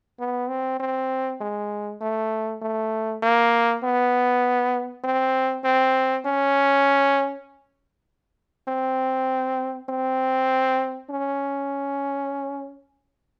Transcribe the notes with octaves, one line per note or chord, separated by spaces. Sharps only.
B3
C4
C4
G#3
A3
A3
A#3
B3
C4
C4
C#4
C4
C4
C#4